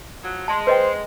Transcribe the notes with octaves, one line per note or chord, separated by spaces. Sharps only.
F3 F#3
G#3 A5 C6
B4 C5 D#5 G5